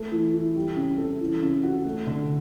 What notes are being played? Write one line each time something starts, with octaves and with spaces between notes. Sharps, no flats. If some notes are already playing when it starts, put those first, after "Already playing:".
Already playing: A3
E3
E3
G3
C#3
A4
E3
C#3
F#4
A3
D3